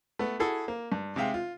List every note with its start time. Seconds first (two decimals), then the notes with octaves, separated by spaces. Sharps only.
0.19 A3 B3
0.40 E4 F#4 G#4 A4
0.68 A#3
0.92 G2
1.16 C3 G#3 E5 F5 G5
1.34 F4